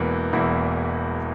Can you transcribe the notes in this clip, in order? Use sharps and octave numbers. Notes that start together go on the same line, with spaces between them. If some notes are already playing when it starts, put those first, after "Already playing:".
Already playing: E1 E2 E3 A#3 E4
E1 E2 E3 A#3 E4